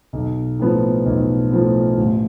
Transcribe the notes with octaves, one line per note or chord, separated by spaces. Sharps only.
B1
A2 F3 B3
B1
A2 F3 B3
A1